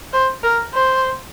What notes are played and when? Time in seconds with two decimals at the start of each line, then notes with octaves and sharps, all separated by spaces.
0.13 C5
0.43 A#4
0.74 C5